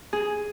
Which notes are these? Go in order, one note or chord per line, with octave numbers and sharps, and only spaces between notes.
G#4